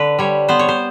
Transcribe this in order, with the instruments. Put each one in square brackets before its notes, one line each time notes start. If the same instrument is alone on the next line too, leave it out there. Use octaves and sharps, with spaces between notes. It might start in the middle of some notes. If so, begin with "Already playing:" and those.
Already playing: [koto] D3 B4
G3 C#5
B3 C5
C#5
C5